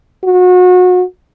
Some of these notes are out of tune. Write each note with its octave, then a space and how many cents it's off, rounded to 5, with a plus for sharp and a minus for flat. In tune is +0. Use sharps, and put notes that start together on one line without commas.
F#4 -30